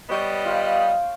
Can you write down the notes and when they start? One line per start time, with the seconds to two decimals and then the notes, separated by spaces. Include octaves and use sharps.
0.09 G3 B3 C#5 D#5
0.45 F4 F5 G5